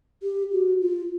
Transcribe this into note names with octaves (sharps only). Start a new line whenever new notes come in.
G4
F#4
F4